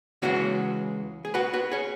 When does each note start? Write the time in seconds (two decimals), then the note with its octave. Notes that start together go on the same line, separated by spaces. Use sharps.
0.22 C#2 C#3 E3 G#3 C#4 F#4
1.25 G#4
1.34 F#4 B4
1.53 F#4 B4
1.72 G#4 C#5